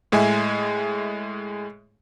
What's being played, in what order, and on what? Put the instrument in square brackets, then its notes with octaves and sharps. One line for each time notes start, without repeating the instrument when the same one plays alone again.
[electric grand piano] A2 G#3 E5 G#5